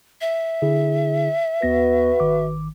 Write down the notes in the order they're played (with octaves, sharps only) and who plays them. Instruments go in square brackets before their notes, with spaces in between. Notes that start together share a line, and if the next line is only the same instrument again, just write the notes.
[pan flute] E5
[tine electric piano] D3 E4 G#4
[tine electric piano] D#2 B3 A#6 [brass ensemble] F#4 B4
[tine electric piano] G#1 D#3 D6